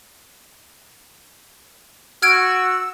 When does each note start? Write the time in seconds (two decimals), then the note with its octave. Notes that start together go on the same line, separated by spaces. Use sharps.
2.22 F#4 E6 F6 G#6 D7